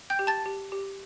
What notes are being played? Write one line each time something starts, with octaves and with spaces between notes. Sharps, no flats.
G5 G6
G4
A5 A6
G4
G4